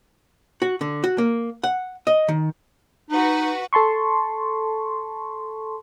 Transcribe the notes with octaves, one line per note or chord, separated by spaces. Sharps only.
F#4
D3
F#4
A#3
F#5
D#5
D#3
D#4 F#4 B4
A4 A5 C6 C#6